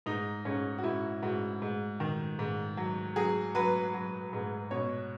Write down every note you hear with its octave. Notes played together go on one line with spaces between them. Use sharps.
G#2 D#4
G#2 C#4
F#4
G#2 E4
G#2 F#4
G#2
D#3
G#2
F#3
F#3 G#4
F#3 B4
F#3
G#2
B2 C#5